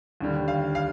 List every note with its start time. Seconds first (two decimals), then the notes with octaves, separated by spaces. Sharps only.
0.21 D#2 D3 G3
0.48 F5
0.75 F5